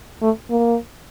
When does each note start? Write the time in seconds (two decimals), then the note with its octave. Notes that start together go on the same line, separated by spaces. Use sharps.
0.22 A3
0.50 A#3